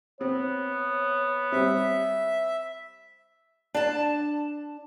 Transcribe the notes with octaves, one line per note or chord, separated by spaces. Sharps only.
B3 C4 C#5
G3 C4 E5
D4 A5